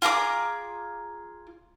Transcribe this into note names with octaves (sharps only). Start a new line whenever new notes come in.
F4 G#4 A#5 D6